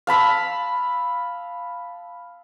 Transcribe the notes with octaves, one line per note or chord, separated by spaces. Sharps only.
F5 A5 B5 E6